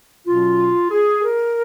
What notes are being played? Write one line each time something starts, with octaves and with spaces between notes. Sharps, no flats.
B2 F#3 C#4 F4
G#4
A#4